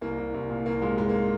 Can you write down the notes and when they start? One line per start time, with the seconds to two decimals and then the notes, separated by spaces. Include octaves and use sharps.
0.01 C2 A#3
0.18 C2
0.34 C2
0.50 A#2
0.66 C2 A#3
0.82 A#2 G#3
0.98 G#1 G#3
1.09 A#3